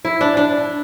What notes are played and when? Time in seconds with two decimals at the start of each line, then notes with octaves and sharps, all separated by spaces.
0.05 E4
0.21 D4
0.37 D4